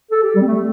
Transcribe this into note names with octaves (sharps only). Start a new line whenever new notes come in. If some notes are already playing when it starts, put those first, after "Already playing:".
A4
G4
G3
C4
A3